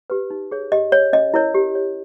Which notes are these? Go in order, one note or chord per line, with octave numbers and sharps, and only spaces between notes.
G4 B4
D#4
G#4 C#5
G4 D#5
C#5
C#4 D#5
E4 A#4 C#5
G4
C#5